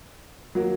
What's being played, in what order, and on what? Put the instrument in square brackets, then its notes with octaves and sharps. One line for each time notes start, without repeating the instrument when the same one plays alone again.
[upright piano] D#3 F#3 A#3